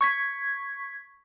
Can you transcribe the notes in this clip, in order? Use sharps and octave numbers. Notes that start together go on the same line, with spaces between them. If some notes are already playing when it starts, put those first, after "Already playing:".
C#6 G#6 B6